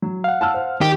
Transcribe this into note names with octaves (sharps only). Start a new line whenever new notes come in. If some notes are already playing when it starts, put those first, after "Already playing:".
F#3
F5 F#5
A5 E6 F6
C5
D#3 G4